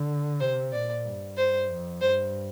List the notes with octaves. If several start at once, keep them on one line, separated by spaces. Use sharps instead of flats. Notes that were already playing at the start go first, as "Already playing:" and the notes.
Already playing: D3
C3 C5
A#2 D5
G2
C5
F2
G2 C5